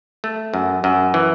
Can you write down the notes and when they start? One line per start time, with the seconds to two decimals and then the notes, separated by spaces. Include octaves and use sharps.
0.24 A3
0.54 F#2
0.84 F#2
1.14 E3